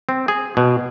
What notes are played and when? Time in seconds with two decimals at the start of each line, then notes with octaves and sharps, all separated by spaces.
0.09 C4
0.28 G#4
0.57 B2